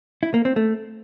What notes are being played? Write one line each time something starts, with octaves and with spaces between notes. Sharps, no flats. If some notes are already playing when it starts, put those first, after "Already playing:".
E4
A#3
C4
A3